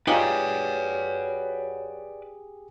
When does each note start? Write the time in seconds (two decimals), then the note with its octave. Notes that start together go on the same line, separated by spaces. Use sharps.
0.07 F#3 D#4 F4 G4 G#4 B4 D5